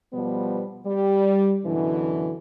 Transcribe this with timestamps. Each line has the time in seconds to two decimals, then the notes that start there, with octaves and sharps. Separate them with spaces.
0.13 B2 F3 G3 B3
0.86 G3
1.65 F#2 B2 D3 E3